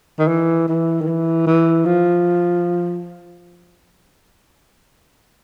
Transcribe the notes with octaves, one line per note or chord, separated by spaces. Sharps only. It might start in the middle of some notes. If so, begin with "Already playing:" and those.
D#3
E3
E3
D#3
E3
E3
F3